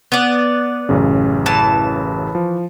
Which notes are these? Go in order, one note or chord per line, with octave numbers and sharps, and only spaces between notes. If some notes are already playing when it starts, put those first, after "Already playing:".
B3 D5
A1 F#2 C#3
E3 A5
F3